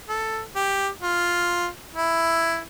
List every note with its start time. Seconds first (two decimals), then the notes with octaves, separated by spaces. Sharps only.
0.08 A4
0.55 G4
1.02 F4
1.95 E4